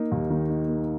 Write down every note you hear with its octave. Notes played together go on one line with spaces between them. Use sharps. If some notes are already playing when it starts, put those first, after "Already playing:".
Already playing: A#3 D#4
D#2
D#3
D#4
A#3